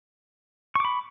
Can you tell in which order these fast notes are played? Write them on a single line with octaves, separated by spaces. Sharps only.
C#6 D6 B5